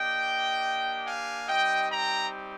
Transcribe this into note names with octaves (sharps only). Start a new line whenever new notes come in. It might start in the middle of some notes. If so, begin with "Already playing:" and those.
Already playing: A#3 D4 G4 D#5 G5
F5 G#5
G3 C4 D#4 G4 D#5 G5
G5 A#5